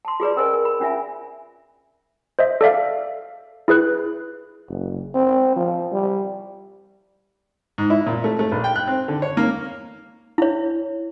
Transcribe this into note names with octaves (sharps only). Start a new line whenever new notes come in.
A5 C6
F4 G#4 B4 D5
C#4 A#4 C5 D#5 G#5
A#4
B5
C#4 D4 F4 E5 G#5
C5 D#5 E5
A4 D5 E5 F5
E4 G#4 B4 F#6
F#1
C4
F3
G3
G#2
E4
A#2
A3
A3
A#1
G5
F#6
C4
D3
C#5
A#3
E4 C#5